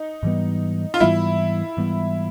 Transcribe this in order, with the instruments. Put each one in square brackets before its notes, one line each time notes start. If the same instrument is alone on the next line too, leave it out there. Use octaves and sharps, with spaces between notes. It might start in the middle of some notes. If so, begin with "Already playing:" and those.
Already playing: [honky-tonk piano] D#4
[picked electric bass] G#2 E3 G3 B3
[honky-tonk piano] F4
[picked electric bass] G#2 E3 G3 B3 [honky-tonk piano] E4
[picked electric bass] G#2 E3 G3 B3